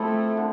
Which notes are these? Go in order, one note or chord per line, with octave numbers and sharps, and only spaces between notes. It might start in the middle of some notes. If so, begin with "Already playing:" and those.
Already playing: F3 A3 C4 E4 A4
D3